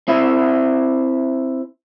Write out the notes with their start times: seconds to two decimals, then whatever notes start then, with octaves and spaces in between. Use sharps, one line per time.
0.08 C4 E4 E5